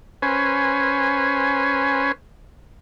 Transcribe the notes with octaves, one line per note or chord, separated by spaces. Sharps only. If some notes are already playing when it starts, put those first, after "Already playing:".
C#4 B4 C5 G#5